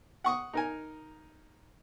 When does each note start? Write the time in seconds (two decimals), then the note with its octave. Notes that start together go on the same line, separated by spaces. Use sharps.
0.24 F#5 C#6 D#6
0.53 D#4 A#4 G#5